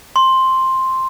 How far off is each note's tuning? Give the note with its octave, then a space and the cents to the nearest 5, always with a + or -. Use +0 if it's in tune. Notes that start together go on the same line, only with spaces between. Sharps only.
C6 +5